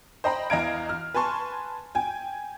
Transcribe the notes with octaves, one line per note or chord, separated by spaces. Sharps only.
C5 D#5 G5 A#5 B5
E2 D#5 F5 A#5 G#6 D7
F6
B4 G#5 A5 C6 C#6
G5 G#5